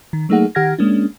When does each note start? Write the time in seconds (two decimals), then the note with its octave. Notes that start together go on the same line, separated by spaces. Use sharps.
0.13 D#3
0.29 F#3 A3 A#3 D#4 G#4 F#5
0.55 D#3 G4 F#5 F6 G#6 A#6
0.79 G#3 A#3 C#4 D4